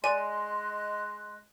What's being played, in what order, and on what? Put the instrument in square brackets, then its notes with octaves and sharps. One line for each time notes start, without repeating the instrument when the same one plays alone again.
[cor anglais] G#3 [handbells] D5 [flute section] D#5 C6 F#6 [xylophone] G#5 D#7